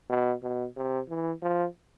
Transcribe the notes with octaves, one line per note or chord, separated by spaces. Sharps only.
B2
B2
C3
E3
F3